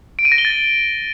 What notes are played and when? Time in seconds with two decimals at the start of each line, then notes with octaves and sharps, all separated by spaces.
0.19 D7
0.25 D#7
0.32 A#6
0.38 G7
0.45 A6